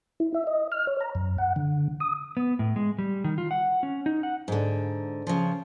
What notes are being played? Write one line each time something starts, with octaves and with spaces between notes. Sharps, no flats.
E4
E5
D#5
F6
C#5
A#5
F#2
F#5
D3
D#6
B3
A2
G#3
G3
D#3
F4
F#5
C#4
D#4
F#5
G#2 D3
C#3 F3